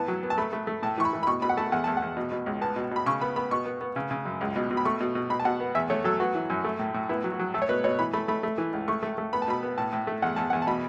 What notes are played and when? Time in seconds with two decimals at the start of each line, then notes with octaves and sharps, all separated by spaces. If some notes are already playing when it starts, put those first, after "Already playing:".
Already playing: E3 B3 A5
0.08 F#3
0.23 B3
0.30 A5
0.38 A3 B5
0.53 A3
0.67 A3
0.83 A2 A5
0.98 E3 C#6
1.05 B5
1.13 E3
1.23 B5
1.27 B2 C#6
1.42 B2 B5
1.49 F#5
1.57 A3 A5
1.72 E2 F#5
1.84 E2 A5
1.97 F#5
2.02 E2
2.17 B2
2.32 B2
2.46 C#2
2.61 B3 A5
2.76 B2
2.91 B2 B5
3.06 C#3 C#6
3.21 B3 B5
3.36 B3 B5
3.51 B2 C#6
3.66 B3
3.81 B3
3.96 C#3
4.11 C#3
4.25 F#2
4.41 C#2
4.56 B2
4.71 B2
4.77 B5
4.85 A3 C#6
5.00 B2
5.15 B2
5.30 B2 B5
5.40 A5
5.45 B2 F#5
5.60 B3
5.75 E2 E5
5.90 A3 C#5
6.04 F#3 A4
6.20 B3 F#4
6.35 E3
6.50 F#2
6.64 A3
6.79 A2
6.94 A2
7.09 B3 E4
7.24 F#3
7.32 F#4
7.39 F#3
7.54 A3 A4
7.62 C#5
7.69 B2 B4
7.84 B2 C#5
7.99 E3 B5
8.13 A3 B5
8.28 A3 B5
8.43 A3
8.58 E3
8.73 C#2
8.88 A3 C#6
9.03 A3
9.18 A3
9.33 B3 B5
9.42 A5
9.48 B2 B5
9.63 B3
9.78 A2 A5
9.93 A2
10.07 A3
10.22 E2 F#5
10.36 E2 A5
10.50 E2 F#5
10.62 A5
10.67 B2 B5